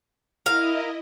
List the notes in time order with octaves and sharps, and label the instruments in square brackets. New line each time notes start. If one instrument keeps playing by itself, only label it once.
[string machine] E4 D#5 [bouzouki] A#4 F5